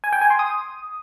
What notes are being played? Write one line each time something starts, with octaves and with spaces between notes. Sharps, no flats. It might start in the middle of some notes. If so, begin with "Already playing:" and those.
G#5
G5
G#5
C6
D#6